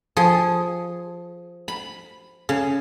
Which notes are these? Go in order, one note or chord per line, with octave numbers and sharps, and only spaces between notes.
F3 G#4
B5
C#3